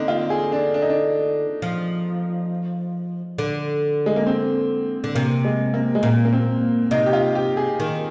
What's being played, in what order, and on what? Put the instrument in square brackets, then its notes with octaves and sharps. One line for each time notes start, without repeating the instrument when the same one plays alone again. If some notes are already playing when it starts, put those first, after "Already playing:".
Already playing: [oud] D3 [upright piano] A#3 C4 D#4
[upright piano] F4
G#4
D4
D4
D#4
D4
[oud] F3
D3
[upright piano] G#3
A#3
C4
[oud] D3
[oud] C3 [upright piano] A#3
[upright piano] G#3
A#3
G#3
[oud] A#2 [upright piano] A#3
[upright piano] A#3
C4
[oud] C3 [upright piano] D#4
[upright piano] G4
F4
G4
G#4
[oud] D#3